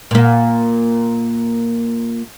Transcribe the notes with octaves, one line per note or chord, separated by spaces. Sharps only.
A#2 A#3